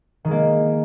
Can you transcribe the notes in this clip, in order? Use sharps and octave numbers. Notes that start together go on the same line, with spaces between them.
D#3 G#3 A#3